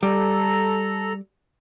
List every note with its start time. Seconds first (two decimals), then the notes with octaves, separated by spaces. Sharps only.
0.03 G3 A4 A#5